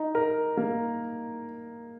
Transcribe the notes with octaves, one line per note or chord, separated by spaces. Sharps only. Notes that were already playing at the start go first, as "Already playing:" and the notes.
Already playing: D#4
A#4
A#3